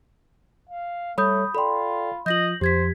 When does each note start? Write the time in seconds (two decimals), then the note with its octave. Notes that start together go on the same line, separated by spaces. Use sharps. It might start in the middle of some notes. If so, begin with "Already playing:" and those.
0.69 F5
1.18 G3 A3 A4 C#5 B5 D#6 G6
1.55 F4 A4 D5 G5 B5 C6
2.26 F3 F4 D#5 G6 A#6 F#7
2.61 F2 F3 G4 C5 G#6 B6